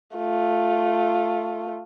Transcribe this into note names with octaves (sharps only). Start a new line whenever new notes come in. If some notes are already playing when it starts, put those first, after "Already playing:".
A3 F4